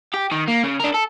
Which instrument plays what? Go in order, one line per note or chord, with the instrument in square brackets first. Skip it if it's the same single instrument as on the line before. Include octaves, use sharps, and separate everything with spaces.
[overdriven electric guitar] G4
D#3
A#3
C#3
D4 A#4
A4